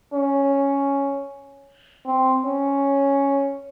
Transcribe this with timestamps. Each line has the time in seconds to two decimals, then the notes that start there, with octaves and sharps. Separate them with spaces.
0.13 C#4
2.06 C4
2.45 C#4